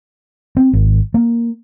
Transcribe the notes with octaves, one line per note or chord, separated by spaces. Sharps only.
C4
G#1
A#3